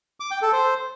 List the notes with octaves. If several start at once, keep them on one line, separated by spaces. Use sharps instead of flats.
D6
G5
A4
C5